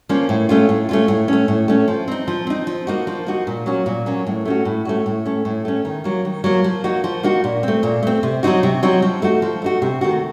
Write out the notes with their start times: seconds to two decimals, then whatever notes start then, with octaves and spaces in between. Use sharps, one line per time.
0.09 F3 A#3 C#4
0.29 A2
0.49 A3 C#4 F4
0.69 A2
0.89 A3 C#4 F4
1.08 A2
1.28 A3 C#4
1.48 A2
1.68 A3 C#4
1.88 F3
2.08 C4 D#4
2.28 F3
2.47 C4 D#4
2.67 F3
2.87 A#3 D#4 F#4
3.07 F3
3.27 A#3 D#4 F#4
3.47 A#2
3.66 F#3 A#3 C#4 F#4
3.86 A#2
4.06 F#3 A#3 C#4 F#4
4.27 A2
4.45 A3 C#4 F#4
4.65 A2
4.85 A3 C#4 F#4
5.06 A2
5.25 A3 C#4
5.45 A2
5.65 A3 C#4
5.85 D#3
6.04 F#3 A#3
6.25 D#3
6.44 F#3 A#3
6.64 F3
6.84 A#3 D#4 F#4
7.04 F3
7.23 A#3 D#4 F#4
7.44 A#2
7.63 A3 C4
7.83 A#2
8.03 A3 C4
8.23 C3
8.43 F#3 C4 D#4 F#4
8.63 C3
8.83 F#3 C4 D#4 F#4
9.02 F3
9.22 A3 D#4 F#4
9.42 F3
9.62 A3 D#4 F#4
9.82 C3
10.01 D#3 A3 C4 F#4